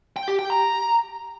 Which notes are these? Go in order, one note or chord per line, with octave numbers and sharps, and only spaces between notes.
G5
G4
G5
A#5